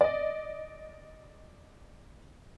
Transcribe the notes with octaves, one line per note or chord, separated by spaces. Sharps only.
D5 D#5